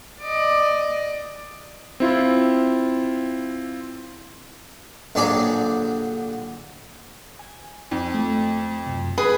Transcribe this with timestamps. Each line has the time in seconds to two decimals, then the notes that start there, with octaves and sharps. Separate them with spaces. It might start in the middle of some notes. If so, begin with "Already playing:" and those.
0.22 D5 D#5
2.00 C4 E4 F4
5.15 A#1 D3 F#3 G4 G#4 D5
7.39 G#5
7.91 F2
8.14 A3
8.86 F#2 C3
9.18 C#4 G#4 B4 G#5